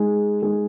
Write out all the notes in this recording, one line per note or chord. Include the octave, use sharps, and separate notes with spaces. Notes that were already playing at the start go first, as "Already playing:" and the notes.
Already playing: G#3 D#4 G#4
G#3 D#4 G#4